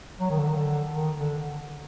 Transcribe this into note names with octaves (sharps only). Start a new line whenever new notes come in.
F#3
D#3
D3
D#3
D3
D#3
D3